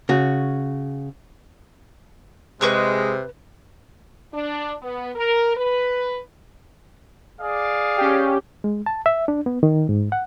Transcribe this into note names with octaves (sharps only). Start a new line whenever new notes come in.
C#3 F#4
C3 G#3 B4 C#6 F#6
D4
B3
A#4
B4
G#4 D5 F5
C#4 G4
G#3
A5
E5
D4
B3
D#3
G#2
F#5